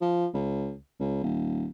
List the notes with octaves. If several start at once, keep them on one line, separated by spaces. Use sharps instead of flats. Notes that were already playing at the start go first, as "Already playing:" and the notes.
F3
C#2
C#2
D#1